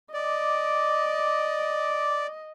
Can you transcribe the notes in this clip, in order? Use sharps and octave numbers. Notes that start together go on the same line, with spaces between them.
D5 D#5 D6